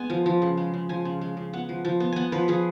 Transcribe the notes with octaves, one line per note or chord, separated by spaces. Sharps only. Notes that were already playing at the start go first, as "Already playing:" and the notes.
Already playing: G#3 B3 G#5
F3
F3
C#3
G#3
C#3
F3 G#5
C#3
G#3
C#3
B3 F#5
F3
F3
B3
B3 F#5 G#5
F3 B4
F3 G#4